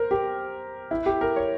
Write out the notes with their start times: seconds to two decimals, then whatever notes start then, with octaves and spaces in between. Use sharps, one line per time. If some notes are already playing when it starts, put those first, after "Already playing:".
Already playing: A#4 C5
0.11 G4
0.91 E4
1.06 G4
1.21 A#4
1.36 C#5